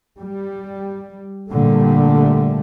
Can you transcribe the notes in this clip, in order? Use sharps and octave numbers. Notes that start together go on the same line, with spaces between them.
G3
A#2 D3 G3 A3